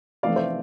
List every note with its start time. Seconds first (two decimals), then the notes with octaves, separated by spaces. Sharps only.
0.23 F1 F2 E3 A3 D5 F5
0.36 C5 E5